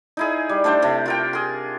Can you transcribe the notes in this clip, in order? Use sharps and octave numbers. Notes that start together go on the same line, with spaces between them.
D#4 E4 G#4
G3
A3 D4 C5 G5
C3 A3
F4 A#4 G5
G#4 C6